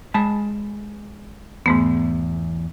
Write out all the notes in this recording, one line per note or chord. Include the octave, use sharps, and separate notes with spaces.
G#3 A5 B5
E2 G#2 A3 B3